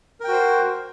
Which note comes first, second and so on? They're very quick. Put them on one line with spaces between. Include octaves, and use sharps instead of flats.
A#4 G5 F#4 C5